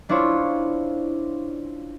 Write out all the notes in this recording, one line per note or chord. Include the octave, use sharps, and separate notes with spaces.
C#4 D4 E4 F4 C5 C#5